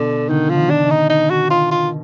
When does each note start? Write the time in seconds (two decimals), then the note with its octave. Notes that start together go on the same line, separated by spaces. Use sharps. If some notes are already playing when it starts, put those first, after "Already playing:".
Already playing: B2 D3
0.29 D3 D#3
0.50 F3
0.56 D#3
0.70 D4
0.84 D#3
0.91 D#4
1.10 D#4
1.30 F#4
1.50 F4
1.71 F4